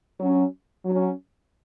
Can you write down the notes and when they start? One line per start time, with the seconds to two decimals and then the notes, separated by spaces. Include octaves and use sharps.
0.20 F#3 C#4
0.85 F#3
0.91 C#4